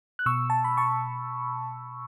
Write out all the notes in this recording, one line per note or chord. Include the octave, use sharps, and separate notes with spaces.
F#6
B2 C#6 E6
A5
B5
A5 C#6